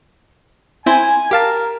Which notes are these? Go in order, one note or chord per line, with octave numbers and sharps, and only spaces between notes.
C4 E4 C5 G#5
G4 A#4 F5 A5